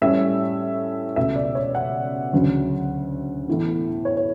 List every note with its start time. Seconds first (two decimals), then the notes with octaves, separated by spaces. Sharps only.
0.02 A2 G3 C#4 E5
1.16 C#2 B2 A3 C#4 E5
1.36 D5
1.55 C#5
1.75 F#5
2.32 D2 C#3 F#3 C#4
3.48 A2 E3 B3
4.05 C#5
4.17 C#5